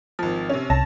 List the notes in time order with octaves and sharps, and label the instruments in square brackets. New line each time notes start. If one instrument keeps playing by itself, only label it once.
[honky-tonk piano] G#1 F3
C3 C#4
[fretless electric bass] C2 [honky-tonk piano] C#4 A5 A#6